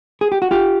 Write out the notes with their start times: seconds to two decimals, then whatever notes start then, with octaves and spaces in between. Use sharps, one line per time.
0.21 G#4
0.32 G4
0.42 F#4
0.51 F4 G4